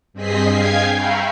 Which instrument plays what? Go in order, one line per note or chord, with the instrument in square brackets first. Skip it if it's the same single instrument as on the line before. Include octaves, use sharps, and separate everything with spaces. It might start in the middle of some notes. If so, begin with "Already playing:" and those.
[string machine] G2 C4 G#4 D#5 B6 C7
F5 G5 G#5 G#6 C7
E5 F5 G5 A#5 B5 C#6